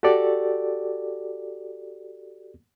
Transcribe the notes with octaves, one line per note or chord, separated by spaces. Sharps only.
F#4 G4 A4 D5